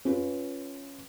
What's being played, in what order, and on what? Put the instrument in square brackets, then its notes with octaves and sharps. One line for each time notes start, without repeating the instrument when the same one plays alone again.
[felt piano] C#4 F4 B4